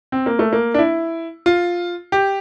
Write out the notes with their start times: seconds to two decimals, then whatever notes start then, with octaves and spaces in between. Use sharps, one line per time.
0.12 C4
0.26 A#3
0.39 A3
0.53 A#3
0.74 D4
0.78 E4
1.46 F4
2.12 G4